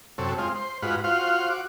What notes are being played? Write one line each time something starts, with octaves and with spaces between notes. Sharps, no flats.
F#2 C3 A4 C#5
G#3 C4 F4
C5
G#2 F4 F#4 B4
F4 F#4 C5 F5
F#4 D6